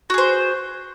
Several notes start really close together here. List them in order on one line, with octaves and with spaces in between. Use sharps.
F#4 G#4 C5